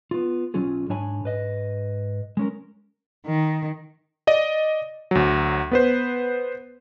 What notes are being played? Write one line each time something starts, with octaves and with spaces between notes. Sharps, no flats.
B3 F4
B1 F#3 C#4 F4 G#4
G#2 D4 C#5 G#5 B5
G#2 B4 D#5
G#3 C#4 A#4
D#3
D5 D#5
D2 F#3
B3 B4 C5